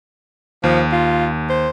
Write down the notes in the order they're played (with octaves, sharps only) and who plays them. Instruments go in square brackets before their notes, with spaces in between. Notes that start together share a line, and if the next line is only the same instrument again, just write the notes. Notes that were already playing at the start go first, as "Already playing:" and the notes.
[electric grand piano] D#2 [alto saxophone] F3
[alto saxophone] F4
C5